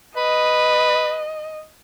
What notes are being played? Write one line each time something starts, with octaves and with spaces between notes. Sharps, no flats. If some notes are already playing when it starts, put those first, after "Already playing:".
B4 D#5